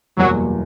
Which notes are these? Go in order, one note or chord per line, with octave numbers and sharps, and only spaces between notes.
F#1 E2 B2 F#3 G3 A#3